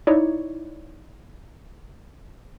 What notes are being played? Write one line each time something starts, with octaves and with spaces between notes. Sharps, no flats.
D#4 E4 C#5 D5